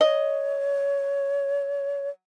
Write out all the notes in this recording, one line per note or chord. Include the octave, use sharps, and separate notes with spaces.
C#5 D#5